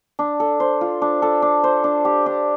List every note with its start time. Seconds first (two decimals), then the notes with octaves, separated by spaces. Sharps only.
0.19 D4
0.40 A4
0.60 C5
0.81 F4
1.02 D4
1.22 A4
1.42 D4
1.64 C5
1.84 D4
2.05 G4
2.26 D4